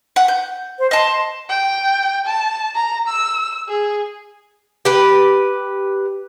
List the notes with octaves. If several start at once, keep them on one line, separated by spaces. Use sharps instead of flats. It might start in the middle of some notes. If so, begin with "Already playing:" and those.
F#5
G6
C5
D#5 A5 C6
G5
A5
A#5
E6
G#4
G4 B4